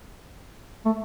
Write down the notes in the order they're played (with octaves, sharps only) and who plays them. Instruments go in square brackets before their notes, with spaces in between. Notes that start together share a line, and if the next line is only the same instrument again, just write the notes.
[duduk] A3